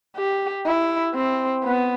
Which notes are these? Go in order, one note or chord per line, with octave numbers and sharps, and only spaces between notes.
G4
E4
C4
B3